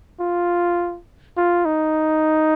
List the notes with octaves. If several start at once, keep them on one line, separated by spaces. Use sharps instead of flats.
F4
F4
D#4